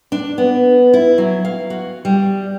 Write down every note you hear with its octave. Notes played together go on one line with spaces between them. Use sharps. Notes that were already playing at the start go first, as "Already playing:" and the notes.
D4
B3
E4
F#3
F5
F#4
G3